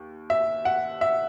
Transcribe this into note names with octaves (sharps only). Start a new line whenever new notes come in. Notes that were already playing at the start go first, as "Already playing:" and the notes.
Already playing: D#2
E5
F#5
E5